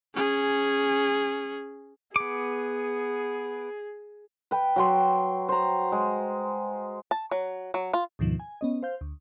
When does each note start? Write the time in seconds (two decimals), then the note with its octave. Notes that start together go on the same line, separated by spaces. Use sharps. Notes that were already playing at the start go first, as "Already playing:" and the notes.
0.15 C#4 G#4
2.16 B3 G#4 D6
4.51 B4 G5
4.76 F#3 G5 C6
5.49 C5 A#5
5.92 G#3
7.11 A5
7.31 F#3
7.74 F#3
7.93 F4
8.19 D2 G#2 B2 D#3 F3
8.40 G#5
8.61 B3 C#4 D#5
8.83 C5 F5 G6
9.01 D2